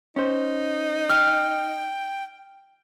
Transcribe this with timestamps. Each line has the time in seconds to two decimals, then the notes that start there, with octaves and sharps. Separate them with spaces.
0.16 C#4 D#4 C5
1.09 G5 F6